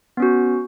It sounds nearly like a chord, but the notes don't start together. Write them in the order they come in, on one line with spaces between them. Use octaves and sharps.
B3 C#4 F#4